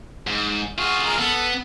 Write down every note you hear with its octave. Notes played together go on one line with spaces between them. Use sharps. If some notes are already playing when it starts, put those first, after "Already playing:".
G#2
F4 F#4 G#4 F6
G#3 A#4 F6
B3 A4